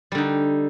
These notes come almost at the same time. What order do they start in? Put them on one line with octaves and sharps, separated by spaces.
G3 D3 D#4